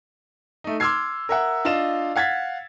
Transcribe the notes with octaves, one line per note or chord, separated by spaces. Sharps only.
A3 D#4
C6 D6 E6 F6 G#6 C7
A#4 E5 F#5
D4 F4 D#5 F5 E7
F5 F#5 G#6 A6 B6